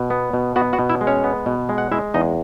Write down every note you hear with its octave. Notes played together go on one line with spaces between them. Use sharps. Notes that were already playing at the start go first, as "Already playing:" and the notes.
Already playing: B2
B3
B2
B3 F#4 F#5
F#4 F#5
B2
E4 E5
G#3
C#4 C#5
B3
B2
G#3
F#5
G#3 E4 E5
E2 D#4 D#5